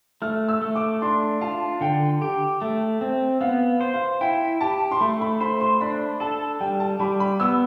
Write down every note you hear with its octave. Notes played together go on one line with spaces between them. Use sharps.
A3 F6
E6
A3
D6
D4 C6
F4 A5
D3 G5
G4
A3
C4
B3 F5
C5
F5
E4 G5
G4 A5
C6
A3 B5
B5
C5 B5
C6
D4 B5
A4 A5
G3 G5
A5
G3 B5
B5
B3 E6